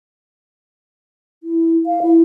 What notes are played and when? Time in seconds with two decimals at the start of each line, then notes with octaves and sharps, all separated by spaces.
1.43 E4
1.86 F5
2.02 E4